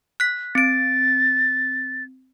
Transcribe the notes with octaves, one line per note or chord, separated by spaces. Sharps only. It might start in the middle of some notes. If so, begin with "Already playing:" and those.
F#6 B6
C4 A6 D7